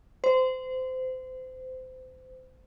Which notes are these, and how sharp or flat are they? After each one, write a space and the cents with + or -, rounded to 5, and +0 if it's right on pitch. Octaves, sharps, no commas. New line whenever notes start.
C5 -25